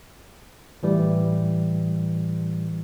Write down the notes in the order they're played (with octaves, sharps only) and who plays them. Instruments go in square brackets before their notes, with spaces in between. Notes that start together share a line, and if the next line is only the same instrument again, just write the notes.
[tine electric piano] A2 E3 G3